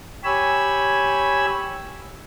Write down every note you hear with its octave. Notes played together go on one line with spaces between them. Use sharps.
G4 C#5 G#5 B5 E6